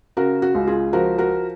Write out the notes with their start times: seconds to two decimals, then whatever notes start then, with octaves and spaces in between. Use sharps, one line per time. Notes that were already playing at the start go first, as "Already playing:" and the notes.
0.17 C#3 F#4 A#4
0.42 F#4
0.55 C#2
0.67 F4 G#4
0.93 F3 F#4 A#4
1.18 F#4 A#4